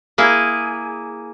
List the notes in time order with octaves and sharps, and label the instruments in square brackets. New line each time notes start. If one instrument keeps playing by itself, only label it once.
[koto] A#3 E4 G#4